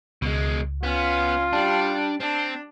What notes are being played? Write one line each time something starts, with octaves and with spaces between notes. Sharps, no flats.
C#2 B2 G#3
B3 C#4 F4
G3 D4 A5
C4 D4